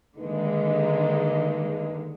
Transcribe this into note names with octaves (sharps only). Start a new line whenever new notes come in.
G2 D3 D#3 G#3 A#3 D#4